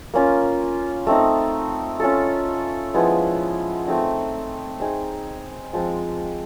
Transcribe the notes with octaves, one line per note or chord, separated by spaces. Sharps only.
A#3 C#4 F4
A3 C4 D#4
C#4 F4 A4
F3 G#3 B3 E4
A3 C4 D#4
C4 D#4 G#4
F3 G#3 C4